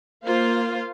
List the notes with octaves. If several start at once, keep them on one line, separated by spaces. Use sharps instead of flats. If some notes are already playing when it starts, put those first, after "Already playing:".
A#3 F4 C5 F5